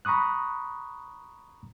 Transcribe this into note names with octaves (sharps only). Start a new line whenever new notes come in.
A#5 B5 C#6 D#6 F#6